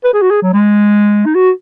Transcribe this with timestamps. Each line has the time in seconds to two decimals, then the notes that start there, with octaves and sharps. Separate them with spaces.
0.04 B4
0.13 G#4
0.22 F#4
0.30 G#4
0.42 F#3
0.53 G#3
1.26 D#4
1.35 F#4